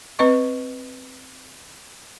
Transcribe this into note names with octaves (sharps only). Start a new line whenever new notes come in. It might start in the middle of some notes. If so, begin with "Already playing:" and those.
C4 B4 D#5 C#6